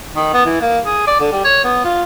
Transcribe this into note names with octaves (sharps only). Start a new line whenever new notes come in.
D#3
B3
E3
A#3
G#4
D5
D3
G3
C#5
B3
F4